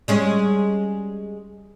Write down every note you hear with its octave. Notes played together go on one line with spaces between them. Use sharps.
G3 G#3 C#4